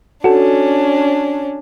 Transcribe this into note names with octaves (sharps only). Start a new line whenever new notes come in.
C#4 D4 F#4 A4